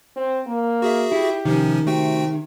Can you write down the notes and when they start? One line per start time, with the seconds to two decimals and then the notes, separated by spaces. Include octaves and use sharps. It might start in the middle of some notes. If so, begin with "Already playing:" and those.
0.16 C4
0.46 A#3
0.82 F#4 G#4 E5
1.12 E4 G4
1.45 C3 D#3 F3 C#4
1.87 C3 A3 F#4 G5